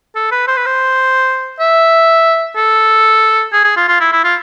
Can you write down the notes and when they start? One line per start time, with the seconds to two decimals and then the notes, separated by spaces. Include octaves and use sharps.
0.16 A4
0.32 B4
0.48 C5
0.57 B4
0.66 C5
1.60 E5
2.56 A4
3.53 G#4
3.64 G#4
3.77 F4
3.88 F4
4.00 E4
4.12 E4
4.24 F4